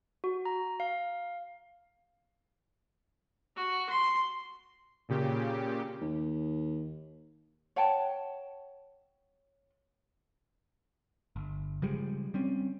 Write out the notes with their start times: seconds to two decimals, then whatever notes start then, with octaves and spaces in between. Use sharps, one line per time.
0.24 F#4
0.45 A#5
0.80 F5
3.56 F#4
3.90 C6
5.09 A#2 C#3 G4
6.01 D#2
7.76 C#5 F#5 G5 A5
11.36 G1
11.82 C#3 F3 G3 G#3
12.34 G3 C4 C#4